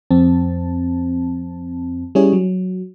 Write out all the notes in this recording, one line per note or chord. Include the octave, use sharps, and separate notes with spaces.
F2 C4 A5
G3 C#4 E4 G#4 C#5
F#3